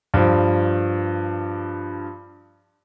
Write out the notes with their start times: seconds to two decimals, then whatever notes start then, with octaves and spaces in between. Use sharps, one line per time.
0.14 G2 F3